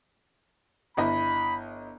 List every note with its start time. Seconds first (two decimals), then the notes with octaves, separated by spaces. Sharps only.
0.97 G1 E4 D#5 B5